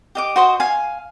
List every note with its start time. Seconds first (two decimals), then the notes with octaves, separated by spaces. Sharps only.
0.15 G4 D#5 D6
0.36 F#4 C5 D#5
0.60 F5 G#5